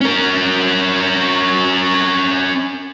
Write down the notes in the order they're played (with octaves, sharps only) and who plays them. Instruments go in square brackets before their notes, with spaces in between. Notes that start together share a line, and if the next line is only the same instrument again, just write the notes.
[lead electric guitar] C#4 A#4